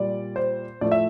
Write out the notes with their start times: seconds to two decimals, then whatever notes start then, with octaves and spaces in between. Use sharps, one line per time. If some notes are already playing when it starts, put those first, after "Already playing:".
Already playing: A#2 G3 D5
0.36 C5
0.81 A2 F3 A3 D5
0.92 E5